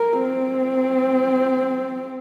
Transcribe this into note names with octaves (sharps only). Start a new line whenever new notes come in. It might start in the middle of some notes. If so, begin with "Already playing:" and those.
Already playing: A#4
C4